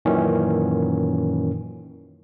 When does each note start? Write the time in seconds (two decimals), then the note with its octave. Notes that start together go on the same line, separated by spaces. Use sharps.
0.05 F#2 A#2 D#3 E3 C#4